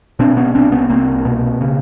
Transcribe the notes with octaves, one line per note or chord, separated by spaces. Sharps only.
B2 C4 D4
B3 C#4
C2 C4 D4
B3 C#4
C2 A#3 C4
B2
C#3